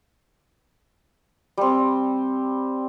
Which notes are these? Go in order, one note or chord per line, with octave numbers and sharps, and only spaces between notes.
G3 C4